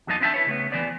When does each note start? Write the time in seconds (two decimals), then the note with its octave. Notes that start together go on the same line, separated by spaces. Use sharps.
0.07 E2 F#3 A#3 D#4 A5
0.20 C4 D4 E4 E5 G5 A5
0.34 E4 B4 C#5
0.47 C#3 A3 B3
0.72 D#2 G#2 E3 B3 C5 D5